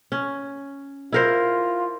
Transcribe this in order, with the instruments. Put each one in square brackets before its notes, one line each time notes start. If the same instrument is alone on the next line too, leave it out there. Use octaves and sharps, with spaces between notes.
[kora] C#4
[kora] E4 A#4 C5 [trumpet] F4